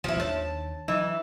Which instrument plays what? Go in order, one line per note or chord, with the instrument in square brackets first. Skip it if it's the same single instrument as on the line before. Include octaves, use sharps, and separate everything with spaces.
[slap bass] D#1 D#2 [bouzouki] F3 E4
[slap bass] D#2 D#3 D4 [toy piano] C#5 [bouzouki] A5
[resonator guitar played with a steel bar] E3 [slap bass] F#3 [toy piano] D#5